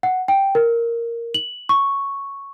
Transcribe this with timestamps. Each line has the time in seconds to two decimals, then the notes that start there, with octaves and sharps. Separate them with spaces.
0.03 F#5
0.28 G5
0.55 A#4
1.34 F#7
1.69 C#6